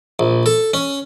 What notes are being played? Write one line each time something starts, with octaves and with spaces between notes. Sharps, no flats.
A#1
A4
C#4